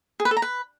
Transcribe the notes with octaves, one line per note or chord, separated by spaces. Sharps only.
G#4
B4
A4
A#5
B4